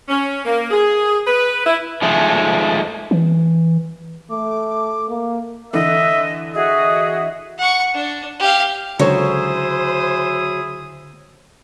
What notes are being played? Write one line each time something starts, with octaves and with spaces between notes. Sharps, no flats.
C#4
A#3
G#4
B4
E4
D#3 F3 G#3 A3
E3
A3 D6
A#3
D3 E3 D#5 E5
F#4 G#4 D#5 E5 D#6
F#5 C#6
D4
G4 F5
C#2 D3 F#3 E4 G#4 C5 C#5 D#6